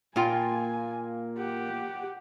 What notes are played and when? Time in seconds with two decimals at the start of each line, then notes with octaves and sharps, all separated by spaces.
0.16 A#2 A#3 F4 G5 G#5
1.38 G4 F#5